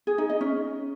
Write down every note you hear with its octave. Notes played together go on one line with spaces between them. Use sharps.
G#4
D#4
D#5
C#4